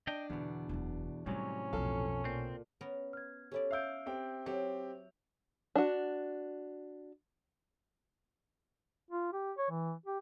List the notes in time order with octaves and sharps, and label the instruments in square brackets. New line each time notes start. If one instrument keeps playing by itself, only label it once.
[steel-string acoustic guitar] D4 [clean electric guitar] D#5 G5
[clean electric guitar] E2 B2 [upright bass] D3 E3
[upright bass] E1 F#2
[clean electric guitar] A2 C3 F#3 [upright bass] E3 G3 [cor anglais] C#4
[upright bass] B1 B2 [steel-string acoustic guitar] F2 A4 F5
[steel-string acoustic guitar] A#2 [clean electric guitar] C4
[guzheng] B3 C#4 A#4
[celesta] F6 G#6
[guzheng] C#4 E4 D5 [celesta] G4 A4 C#5
[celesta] E5 E6 D7 [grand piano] F5 G6
[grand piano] C4 G4 G5
[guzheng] F#3 [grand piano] C4 G4
[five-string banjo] D4 F#4
[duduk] F4
G4
C#5
E3
G4